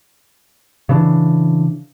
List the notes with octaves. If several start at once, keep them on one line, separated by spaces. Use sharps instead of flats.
C#3 E3 D4